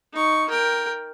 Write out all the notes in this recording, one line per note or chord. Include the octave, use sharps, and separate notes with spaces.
D#4 C#6
A#4 G5